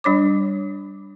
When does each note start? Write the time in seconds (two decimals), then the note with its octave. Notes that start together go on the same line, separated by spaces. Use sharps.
0.04 G3 D4 C#5 D6